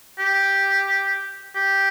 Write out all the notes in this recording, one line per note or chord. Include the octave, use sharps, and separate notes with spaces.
G4
G4